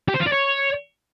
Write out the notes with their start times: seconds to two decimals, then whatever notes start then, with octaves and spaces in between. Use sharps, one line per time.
0.08 G4
0.14 C5
0.20 F4
0.26 D5
0.32 C#5